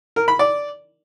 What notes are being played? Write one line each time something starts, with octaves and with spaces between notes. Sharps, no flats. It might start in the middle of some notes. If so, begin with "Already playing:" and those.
A#4
B5
D5